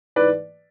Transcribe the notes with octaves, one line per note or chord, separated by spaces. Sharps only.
G#2 E3 B4 D5